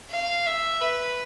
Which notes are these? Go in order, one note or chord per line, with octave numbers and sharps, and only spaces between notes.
F5
E5
B4